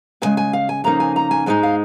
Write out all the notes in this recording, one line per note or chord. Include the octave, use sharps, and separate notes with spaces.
D#2 C#3 G#3 G#5
G#5
F5
G#5
F2 C#3 A#3 D#4 A#5
G#5
A#5
G#5
G#2 G#3 D#4 G#5
F5